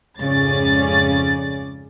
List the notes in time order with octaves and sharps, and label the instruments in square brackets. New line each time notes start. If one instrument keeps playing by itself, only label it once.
[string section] F2 G#2 C#3 C#4 D5 A6